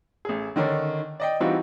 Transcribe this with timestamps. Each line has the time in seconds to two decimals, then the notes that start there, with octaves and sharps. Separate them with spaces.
0.25 A1 G#4
0.56 D3 D#3 C#4 D4
1.20 D5 D#5 G5
1.40 E3 G3 C4 D#4 F4 F#4